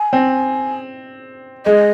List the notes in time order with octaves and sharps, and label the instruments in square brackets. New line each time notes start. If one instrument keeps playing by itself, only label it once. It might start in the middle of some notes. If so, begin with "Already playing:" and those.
Already playing: [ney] G#5
[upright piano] C4
[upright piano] G#3 [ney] D#5